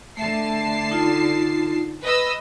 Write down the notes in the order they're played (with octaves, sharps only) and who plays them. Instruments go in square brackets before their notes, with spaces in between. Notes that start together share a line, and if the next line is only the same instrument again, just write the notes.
[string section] D3 A5 C7 [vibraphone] A3 E5
[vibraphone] D#4 F4
[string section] B4 D#5 E6